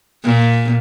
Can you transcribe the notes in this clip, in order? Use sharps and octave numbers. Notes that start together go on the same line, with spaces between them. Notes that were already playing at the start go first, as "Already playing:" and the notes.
A#2